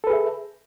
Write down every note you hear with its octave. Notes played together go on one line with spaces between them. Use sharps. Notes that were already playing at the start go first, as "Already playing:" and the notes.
G#4 A4 B4 E5